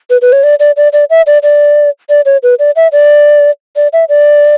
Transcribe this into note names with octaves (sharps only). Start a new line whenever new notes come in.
B4
B4
C#5
D5
D5
D5
D5
E5
D5
D5
D5
C#5
B4
D5
E5
D5
D5
E5
D5